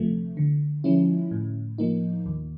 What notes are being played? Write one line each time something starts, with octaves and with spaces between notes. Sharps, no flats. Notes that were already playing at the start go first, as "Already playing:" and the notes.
Already playing: D2 C3 F3 A3
D3
F3 G#3 C#4 E4
A2
F3 A#3 D#4
D#2